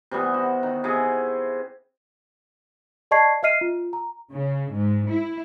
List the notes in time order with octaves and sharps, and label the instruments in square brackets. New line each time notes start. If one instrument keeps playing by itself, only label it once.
[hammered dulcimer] C3 E3 G3 B3
F#4
D#3
C3 E4 G#4
[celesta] D5 D#5 A5 C#6 G#6 C7
D#5 E5 F6 C7 D#7
F4
A#5
[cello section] C#3
G#2
E4